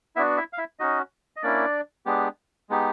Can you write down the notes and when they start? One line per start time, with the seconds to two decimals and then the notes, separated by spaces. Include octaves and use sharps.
0.16 B3 D4 E4 F#4 E5
0.37 E4 E5
0.53 F5
0.58 E4 E5
0.79 C#4 D#4 F#4 D#5
1.36 D#5
1.43 A#3 C#4 D4 E4 D5
2.06 G#3 B3 D4 G4
2.70 G#3 B3 D#4 G4